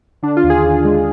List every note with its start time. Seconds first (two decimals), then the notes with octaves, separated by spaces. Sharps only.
0.22 D3 D4
0.37 F4
0.44 D#2
0.50 G#4
0.64 D#2
0.84 G#3